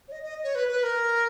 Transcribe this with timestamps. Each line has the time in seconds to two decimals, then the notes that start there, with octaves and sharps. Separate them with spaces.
0.08 C#5
0.12 D#5
0.23 D#5
0.44 C#5
0.55 B4
0.69 B4
0.83 A#4